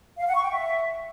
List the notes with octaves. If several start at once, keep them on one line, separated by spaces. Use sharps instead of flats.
F5
F#5
C#6
G5
E5